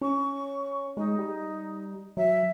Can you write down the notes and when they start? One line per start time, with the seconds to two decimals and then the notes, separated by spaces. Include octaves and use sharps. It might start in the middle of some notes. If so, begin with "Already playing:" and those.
0.01 C#4 C#6
0.97 G#3 D#4
1.18 G3
2.17 F#3 E5